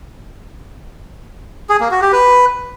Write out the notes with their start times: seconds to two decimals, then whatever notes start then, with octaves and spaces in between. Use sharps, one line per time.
1.69 G#4
1.80 A#3
1.91 F#4
2.02 G4
2.13 B4